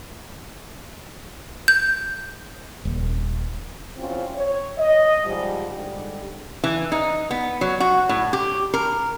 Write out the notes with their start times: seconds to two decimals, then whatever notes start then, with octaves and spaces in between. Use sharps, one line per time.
1.68 G6
2.85 D#1
3.97 E2 C4 C#4 F4
4.34 C#5
4.78 D#5
5.25 G#2 F3 G3
5.76 G#2 D3 G3
6.64 E3
6.92 D#4
7.31 B3
7.61 F#3
7.80 F#4
8.09 A2
8.33 G4
8.74 A#4